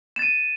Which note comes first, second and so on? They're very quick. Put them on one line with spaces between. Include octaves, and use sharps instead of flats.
E7 A6 D#7